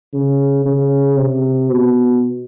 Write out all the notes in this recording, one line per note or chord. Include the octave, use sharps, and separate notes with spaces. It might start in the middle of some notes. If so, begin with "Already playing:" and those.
C#3
C#3
C3
B2